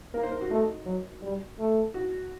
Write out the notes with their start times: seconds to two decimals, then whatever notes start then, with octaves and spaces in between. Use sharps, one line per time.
0.14 A#3 A#4
0.23 C5
0.32 A#4
0.41 F#4
0.50 A3 D#4
0.86 F#3
1.22 G3
1.58 A3
1.94 F#4